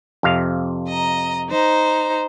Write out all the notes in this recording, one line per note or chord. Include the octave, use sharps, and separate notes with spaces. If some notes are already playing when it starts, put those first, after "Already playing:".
F2 C3 F5
D#5 A#5
D#4 C5 A#5